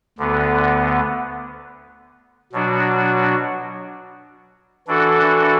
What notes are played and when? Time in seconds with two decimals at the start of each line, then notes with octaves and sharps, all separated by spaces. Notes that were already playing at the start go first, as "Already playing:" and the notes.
0.18 D2 D3 B3
2.53 B2 F#3 D4 F#4
4.87 E3 D4 F#4 A4